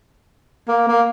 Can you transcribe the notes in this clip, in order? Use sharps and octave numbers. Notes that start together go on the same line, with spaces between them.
A#3
A#3